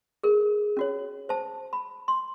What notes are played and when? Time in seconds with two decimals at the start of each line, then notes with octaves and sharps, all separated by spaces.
0.23 G#4 A#4
0.77 C#4 F#4 C#5
1.29 C5 A5
1.73 B5
2.08 C6